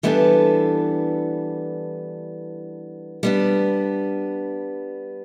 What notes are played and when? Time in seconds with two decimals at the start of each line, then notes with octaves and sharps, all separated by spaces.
0.03 E3 G3 B3 D4 A4
3.23 G3 B3 D4